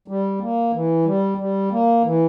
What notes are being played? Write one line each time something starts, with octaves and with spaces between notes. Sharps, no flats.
G3
A#3
E3
G3
G3
A#3
E3